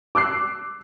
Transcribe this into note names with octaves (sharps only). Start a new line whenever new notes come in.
D6 E6 F#6 C7